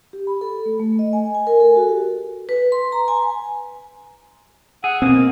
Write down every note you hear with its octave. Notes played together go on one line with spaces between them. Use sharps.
G4
B5
A4
A3
A3
D#5
G#5
G#5
A#4
A4
F#4
G4
B4
C6
A#5
G#5
G#4 F#5 E6
B2 A#3 C4 D#6